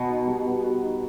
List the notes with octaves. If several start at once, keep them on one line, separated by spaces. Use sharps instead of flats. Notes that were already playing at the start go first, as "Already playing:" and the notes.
Already playing: B2 B3 F#4
D#4
G3
B3
F#4
D#4